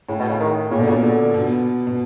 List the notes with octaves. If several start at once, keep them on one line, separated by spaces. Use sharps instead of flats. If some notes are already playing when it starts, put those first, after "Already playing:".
A2 C#3
B2
C#3
D#3
A#2 C#3
B2 D3
A#2 C#3
D3
B2
B2